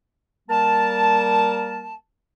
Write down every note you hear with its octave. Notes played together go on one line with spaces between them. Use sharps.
G3 A#3 A#4 A5